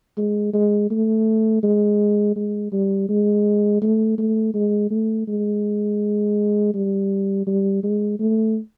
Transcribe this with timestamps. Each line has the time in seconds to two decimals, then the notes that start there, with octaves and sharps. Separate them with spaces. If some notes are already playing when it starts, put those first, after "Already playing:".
0.17 G#3
0.53 G#3
0.91 A3
1.63 G#3
2.36 G#3
2.72 G3
3.09 G#3
3.82 A3
4.18 A3
4.54 G#3
4.91 A3
5.28 G#3
6.74 G3
7.47 G3
7.83 G#3
8.19 A3